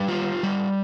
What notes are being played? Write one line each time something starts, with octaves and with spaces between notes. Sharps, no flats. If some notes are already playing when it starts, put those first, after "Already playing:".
Already playing: G3 G4 B4
F4
G3